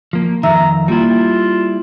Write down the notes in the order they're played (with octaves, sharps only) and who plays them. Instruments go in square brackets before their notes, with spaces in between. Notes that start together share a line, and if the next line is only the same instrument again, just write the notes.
[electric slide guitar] F3 A#3
[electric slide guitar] F2 D#3 [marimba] E5 E6 [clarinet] A#5
[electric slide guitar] G3 E4 [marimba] A#3 [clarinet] F4